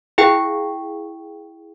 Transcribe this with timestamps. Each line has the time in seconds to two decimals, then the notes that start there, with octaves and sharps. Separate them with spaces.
0.18 E4 G#4 F5 G5